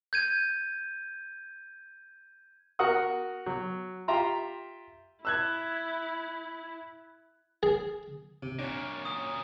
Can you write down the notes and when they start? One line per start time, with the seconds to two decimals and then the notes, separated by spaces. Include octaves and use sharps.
0.13 G6 G#6 D#7
2.79 F#4 A#4 F#5 D#6
3.46 F#3
4.08 F4 G4 E5 A#5 C6
5.25 E4 E6 F#6 G#6
7.63 G#4
8.43 C3
8.59 F#2 A#2 D4 C#5
9.05 D#6